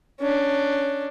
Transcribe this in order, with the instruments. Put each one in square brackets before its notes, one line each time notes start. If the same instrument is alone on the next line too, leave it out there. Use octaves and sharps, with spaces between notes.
[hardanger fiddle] C#4 D4